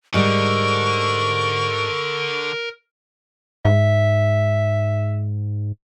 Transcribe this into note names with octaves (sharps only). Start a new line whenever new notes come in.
G#2 D3 G3 A#4 C#6
G#2 E5